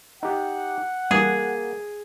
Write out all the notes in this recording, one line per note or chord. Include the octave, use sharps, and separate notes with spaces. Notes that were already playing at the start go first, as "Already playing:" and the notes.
D#4 G4 F#5
E3 G3 A#3 G#4